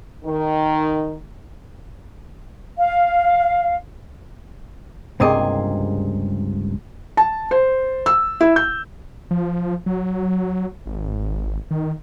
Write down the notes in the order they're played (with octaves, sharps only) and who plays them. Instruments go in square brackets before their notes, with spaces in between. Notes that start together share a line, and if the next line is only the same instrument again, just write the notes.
[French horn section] D#3
[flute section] F5
[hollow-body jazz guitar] C#2 G2 C3 A#3 G#4 D#5
[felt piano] A5
C5
E6
E4
G6
[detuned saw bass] F3
F#3
G#1
D#3